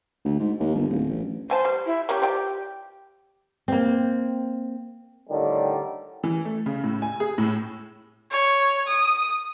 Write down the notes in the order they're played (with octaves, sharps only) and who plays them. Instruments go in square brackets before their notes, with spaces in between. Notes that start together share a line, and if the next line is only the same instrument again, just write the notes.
[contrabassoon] D2
G#2
D#2
G1
D1
A1
[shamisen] F3 G#5 A5 [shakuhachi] C5
[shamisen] G3
[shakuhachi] E4
[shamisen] A#3 C#4 [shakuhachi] G4
[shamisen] F3 D5 G5
[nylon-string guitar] A#3 C4
[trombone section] A2 D3 D#3 G3
[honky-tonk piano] E3
A3
C#3
A2
G#5
G#4
A2
[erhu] C#5
D#6